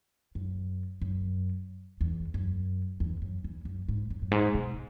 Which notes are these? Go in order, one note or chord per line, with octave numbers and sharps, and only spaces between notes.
F#2
F#2
E2
F#2
E2
F#2
E2
F#2
G#2
F#2
F#2
G#2
B2